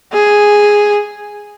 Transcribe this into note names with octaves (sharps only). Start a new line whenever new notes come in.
G#4